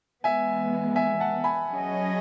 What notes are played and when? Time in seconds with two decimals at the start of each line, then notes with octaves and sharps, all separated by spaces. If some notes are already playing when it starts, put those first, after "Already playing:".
0.24 E3 G#3 B3 E5 G#5
0.96 E5 G#5
1.20 F#5 A5
1.44 G#5 B5
1.68 F#3 C#4 G#4 D#5